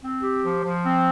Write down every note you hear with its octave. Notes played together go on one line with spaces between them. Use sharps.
C4
G4
F3
F3
C4